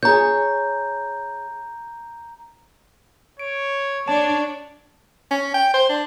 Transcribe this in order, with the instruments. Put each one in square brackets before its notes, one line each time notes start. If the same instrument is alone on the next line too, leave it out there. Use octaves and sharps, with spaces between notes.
[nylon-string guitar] G#4 C#5 [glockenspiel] A#5 G6
[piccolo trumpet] C#5 [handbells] D7
[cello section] D4 D5 [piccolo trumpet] C#5 [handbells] A5
[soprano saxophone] C#4
G5
C5
D4